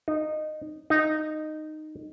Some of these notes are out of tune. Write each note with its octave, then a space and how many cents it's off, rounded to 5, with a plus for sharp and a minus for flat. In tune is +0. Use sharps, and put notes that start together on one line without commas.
D#4 -15
D#4 -10